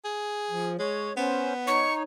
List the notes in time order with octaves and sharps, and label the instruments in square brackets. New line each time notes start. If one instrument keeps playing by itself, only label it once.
[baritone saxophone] G#4
[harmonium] F3
[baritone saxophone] G#3 [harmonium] C#5
[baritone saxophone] B3 [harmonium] C#4 C5
[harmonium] D#4 C#5 [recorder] C#6